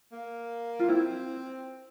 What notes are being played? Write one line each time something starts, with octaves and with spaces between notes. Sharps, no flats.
A#3
F4
C4 E4